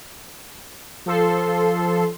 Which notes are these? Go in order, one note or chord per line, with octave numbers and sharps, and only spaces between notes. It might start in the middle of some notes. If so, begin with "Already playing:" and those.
F3 A4 C6